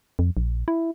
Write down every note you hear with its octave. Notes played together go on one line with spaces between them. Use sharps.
F2
A#1
E4